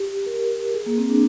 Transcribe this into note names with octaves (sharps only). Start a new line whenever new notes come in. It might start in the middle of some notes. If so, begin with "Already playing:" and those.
Already playing: G4
A#4
G#4
A#3
C4
D4